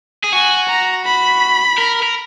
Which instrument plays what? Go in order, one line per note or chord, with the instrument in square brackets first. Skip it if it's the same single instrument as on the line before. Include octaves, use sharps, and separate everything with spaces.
[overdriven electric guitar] G#4
[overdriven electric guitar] F#4 [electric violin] G#5
[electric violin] A#5
B5
[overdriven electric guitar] A#4
A#4